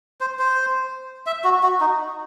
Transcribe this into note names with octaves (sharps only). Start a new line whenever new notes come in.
C5
C5
E5
F#4
F#4
D#4